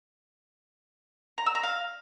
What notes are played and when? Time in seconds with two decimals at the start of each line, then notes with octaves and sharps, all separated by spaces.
1.38 A#5
1.46 E6
1.55 A#5
1.63 F5